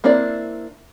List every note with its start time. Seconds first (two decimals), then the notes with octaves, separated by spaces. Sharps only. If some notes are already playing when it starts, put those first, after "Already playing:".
0.04 A#3 C4 D4 E4 D5